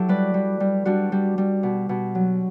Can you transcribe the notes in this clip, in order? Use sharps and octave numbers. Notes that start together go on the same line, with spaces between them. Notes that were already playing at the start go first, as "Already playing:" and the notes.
Already playing: F#3 E4 G4 A4
G3 B4 D5
G3
G3
G3 D4 F#4
G3
G3
B2
B2
F#3